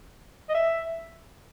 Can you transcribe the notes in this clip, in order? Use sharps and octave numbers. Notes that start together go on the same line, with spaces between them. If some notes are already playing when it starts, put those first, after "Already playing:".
D#5
E5